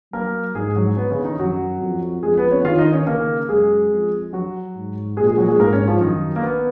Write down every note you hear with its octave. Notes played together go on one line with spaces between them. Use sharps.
F#3 A#3 A#4
G#2 G#3 G#4
F#3 F#4
B3
C#3 C#4
D#3 D#4
F#2 F#3 F#4
F2
F2 G#3 G#4
B3 B4
C#4 C#5
D#3 F4 F5
D#4 D#5
C#4 C#5
C#3 A#3 A#4
F#2 G#3 G#4
F2
F#3 F#4
G#2
A#2 G#3 G#4
G#3 G#4
F#3 F#4
G#3 G#4
G#2 A#3 A#4
C#4 C#5
F3 F4
F#2 D#3 D#4
A#3
B3